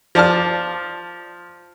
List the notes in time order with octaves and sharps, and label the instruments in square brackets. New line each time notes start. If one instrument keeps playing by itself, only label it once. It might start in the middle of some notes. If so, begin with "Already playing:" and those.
[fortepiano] F3 D5 A5 F6